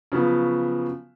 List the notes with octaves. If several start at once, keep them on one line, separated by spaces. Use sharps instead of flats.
C#3 F3 F#3 B3